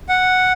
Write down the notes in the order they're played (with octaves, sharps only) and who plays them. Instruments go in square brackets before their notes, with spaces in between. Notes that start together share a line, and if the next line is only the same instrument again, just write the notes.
[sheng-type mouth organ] F#5